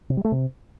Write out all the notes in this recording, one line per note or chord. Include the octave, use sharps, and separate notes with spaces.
C3
G3
A3
C3